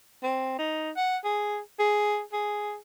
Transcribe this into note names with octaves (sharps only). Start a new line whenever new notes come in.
C4
D#4
F#5
G#4
G#4
G#4